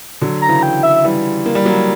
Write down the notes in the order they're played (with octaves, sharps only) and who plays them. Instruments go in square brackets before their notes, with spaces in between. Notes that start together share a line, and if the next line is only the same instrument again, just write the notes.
[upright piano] D3 F#3
[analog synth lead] A#5
[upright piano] C#3 E3
[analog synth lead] G5
E5
[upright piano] E3 G3
A#3
G3
F#3 A#3